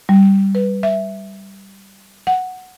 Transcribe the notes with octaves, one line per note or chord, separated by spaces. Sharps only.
G3
B4
E5
F#5